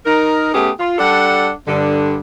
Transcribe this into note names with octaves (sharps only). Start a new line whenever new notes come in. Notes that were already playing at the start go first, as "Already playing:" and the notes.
D#4 A#4
A3 B3 C#4 G4 G#4
F4
G3 D4 A4 F#5
G2 D3